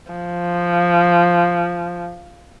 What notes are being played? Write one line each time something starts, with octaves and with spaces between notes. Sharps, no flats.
F3